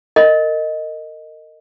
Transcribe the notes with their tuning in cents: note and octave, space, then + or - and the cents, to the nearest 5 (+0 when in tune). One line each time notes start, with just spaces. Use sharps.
A#4 -30 D#5 +0